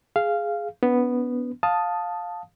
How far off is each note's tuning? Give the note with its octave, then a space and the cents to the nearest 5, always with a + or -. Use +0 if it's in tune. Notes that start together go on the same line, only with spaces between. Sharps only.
G#4 +0 F5 -10
B3 +0 D4 -45
F5 +15 A5 +0 D#6 +0